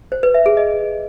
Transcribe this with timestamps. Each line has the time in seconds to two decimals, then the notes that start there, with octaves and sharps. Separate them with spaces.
0.12 C5
0.23 B4
0.34 E5
0.46 G#4
0.57 D#5